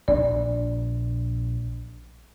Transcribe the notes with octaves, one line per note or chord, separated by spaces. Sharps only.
A#1 D4 D5